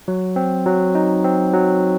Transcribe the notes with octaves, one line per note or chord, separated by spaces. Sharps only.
F#3
C4
F#3
D#4
C4
F#3